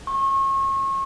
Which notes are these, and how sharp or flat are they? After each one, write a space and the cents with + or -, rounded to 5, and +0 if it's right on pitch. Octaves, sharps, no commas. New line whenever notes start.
C#6 -35